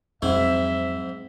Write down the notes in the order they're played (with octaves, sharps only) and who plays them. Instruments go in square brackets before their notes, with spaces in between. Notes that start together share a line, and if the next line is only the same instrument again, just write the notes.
[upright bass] F2 F#3 [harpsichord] G#2 C4 E4 [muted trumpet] E5